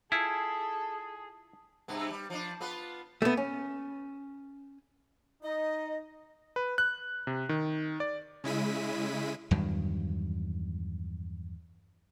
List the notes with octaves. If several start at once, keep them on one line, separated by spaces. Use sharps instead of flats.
E4 F4 G#4 A4
G2 C3 B3
G3
F3 D4
B3 F4 B4
A3 B3
C#4
D#4 D#5
B4
F#6
C3
D#3
D5
C#3 G#3 E4 B6 D#7
E2 G2 D#3 F#3